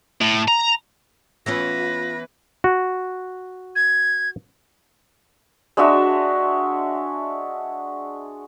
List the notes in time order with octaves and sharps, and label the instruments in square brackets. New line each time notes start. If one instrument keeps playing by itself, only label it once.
[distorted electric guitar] A2
A#5
[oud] E3 B3 C#4 [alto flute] F4 [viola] B4 [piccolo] A#6
[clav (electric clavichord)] F#4
[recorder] G#6
[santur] G#3 D4 F#4 E5